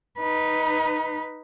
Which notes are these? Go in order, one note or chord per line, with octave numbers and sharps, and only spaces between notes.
D#4 B4